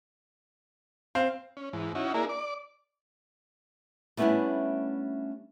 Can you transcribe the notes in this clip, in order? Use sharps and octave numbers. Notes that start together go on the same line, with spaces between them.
C4 F5
C#4
G#2 E3
C#4 D#4 E4 F#4
A#3 D4 E4 G#4 A#4
D5 D6
G3 A3 B3 C#4 D4 E4